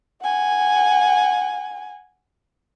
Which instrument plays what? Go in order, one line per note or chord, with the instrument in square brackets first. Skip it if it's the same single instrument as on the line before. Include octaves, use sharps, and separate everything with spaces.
[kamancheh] F#5 G#5